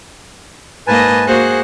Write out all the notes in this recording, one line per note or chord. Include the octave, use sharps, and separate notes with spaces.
G#2 A#3 B4 D#5 G#5 A5
A#3 F#4 G#4 C5 F#6